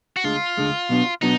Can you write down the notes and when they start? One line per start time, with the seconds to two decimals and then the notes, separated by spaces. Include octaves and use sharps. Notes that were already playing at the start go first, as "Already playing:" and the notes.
0.17 F#4
0.24 D2 D3 G#3 F4
0.57 D2 D3 G#3
0.89 B2 F#3 B3 D4 F#4
1.22 B2 F#3 B3 D4 D#4 F#4